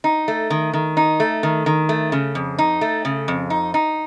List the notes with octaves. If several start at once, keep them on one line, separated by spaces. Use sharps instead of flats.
D#4
A3
D#3
D#3
D#4
A3
D#3
D#3
A3
C#3
F2
D#4
A3
C#3
F2
D#4
D#4